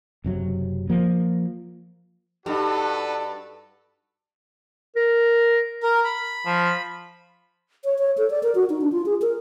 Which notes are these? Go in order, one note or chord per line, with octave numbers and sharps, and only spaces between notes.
F#1 C3 F#3
F3 A#3
G2 D#4 F#4 G4 A4 B4
A#4
A#4
B5
F3
C#5
C#5
A4
D5
A#4
F#4
D#4
D4
F4
G#4
A#4